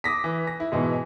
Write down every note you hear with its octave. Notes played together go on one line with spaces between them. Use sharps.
D6 D#6 A#6 B6
E3
A#6
E4
G#2 B2 E3